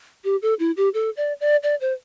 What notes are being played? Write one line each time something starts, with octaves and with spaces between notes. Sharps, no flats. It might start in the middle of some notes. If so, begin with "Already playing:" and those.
G4
A4
E4
G4
A4
D5
D5
D5
C5